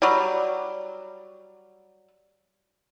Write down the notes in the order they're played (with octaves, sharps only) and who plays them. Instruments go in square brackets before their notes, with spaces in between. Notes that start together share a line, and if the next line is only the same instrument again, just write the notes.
[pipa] F#3 G3